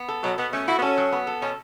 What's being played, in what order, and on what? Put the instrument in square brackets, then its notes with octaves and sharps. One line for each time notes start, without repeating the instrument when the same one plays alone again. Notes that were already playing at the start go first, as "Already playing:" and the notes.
Already playing: [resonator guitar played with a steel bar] B3
A4
[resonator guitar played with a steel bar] B2 [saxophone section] F#3
[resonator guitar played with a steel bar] B2 [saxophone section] B3
[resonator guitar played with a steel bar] A3 [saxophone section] C#4
[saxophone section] E4 [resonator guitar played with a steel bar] F#4
[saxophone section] B3
[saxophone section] C#4 [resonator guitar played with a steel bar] A4
[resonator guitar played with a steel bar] F#3
B3
A4
[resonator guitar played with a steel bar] B2 [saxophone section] C#4